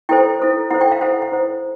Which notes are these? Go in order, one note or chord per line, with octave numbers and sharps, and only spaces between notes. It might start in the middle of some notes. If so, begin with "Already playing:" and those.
E4 A4 C5 G5
E4 A4 C5
E4 A4 C5 F#5
G5
F5
E4 A4 C5 F#5
F#5
E4 A4 C5